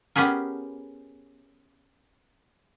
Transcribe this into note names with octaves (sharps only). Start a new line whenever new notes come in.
B3 C#4 G4 G#4 A#4